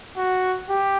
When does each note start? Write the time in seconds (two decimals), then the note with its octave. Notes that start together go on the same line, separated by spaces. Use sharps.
0.17 F#4
0.69 G4